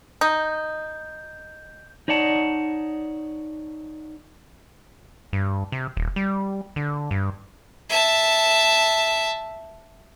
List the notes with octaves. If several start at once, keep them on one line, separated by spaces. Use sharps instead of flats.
D#4 G6
D#4 C#5 D5 F#5 A5
G2
C3
D#1
G3
D3
G2
E5 A5